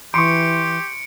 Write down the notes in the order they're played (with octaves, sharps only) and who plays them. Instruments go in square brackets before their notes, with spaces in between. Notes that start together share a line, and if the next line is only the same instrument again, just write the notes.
[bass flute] E3 [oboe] G4 [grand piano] C6 C#6 [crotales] C#7 D7